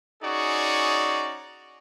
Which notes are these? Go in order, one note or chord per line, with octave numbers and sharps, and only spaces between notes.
C#4 D#4 F#4 G#4 D5 C#6